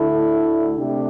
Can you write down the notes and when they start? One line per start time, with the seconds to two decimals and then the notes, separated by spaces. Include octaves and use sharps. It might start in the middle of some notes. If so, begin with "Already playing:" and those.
Already playing: D2 D3 A3 E4 A4
0.77 C3 A3 D4 G4